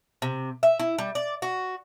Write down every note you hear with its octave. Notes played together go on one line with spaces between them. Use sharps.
C3
E5
E4
G3
D5
F#4